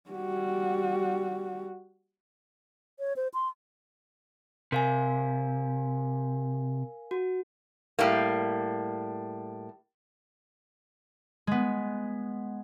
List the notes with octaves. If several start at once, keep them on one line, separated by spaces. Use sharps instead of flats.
G3 F#4
C#5
C5
C6
C3 A#4 F5 G#5
F#4
A2 G3 A#3
G#3 B3